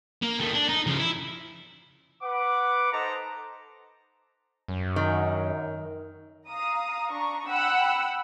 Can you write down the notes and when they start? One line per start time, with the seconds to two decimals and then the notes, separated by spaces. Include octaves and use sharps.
0.23 A#3
0.40 D#3 A3
0.54 D4
0.69 D#4
0.87 C#3 F3
1.00 E4
2.22 B4 F#5 D6
2.92 D#4 A4 C5 D#5 A5 A#5
4.68 F#2
4.96 D#3
6.49 F5 A#5 D#6
7.13 D4 A#5 C#6
7.48 F#5 G5 B5 E6 F#6